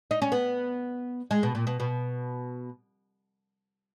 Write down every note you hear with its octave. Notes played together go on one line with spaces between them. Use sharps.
D#4
C#4
B3
G#3
B2
A#2
B2
B2